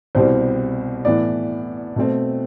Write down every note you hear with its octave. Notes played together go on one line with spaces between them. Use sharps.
C2 B2 G3 C4 C5
A2 E3 B3 D5
B2 A3 C4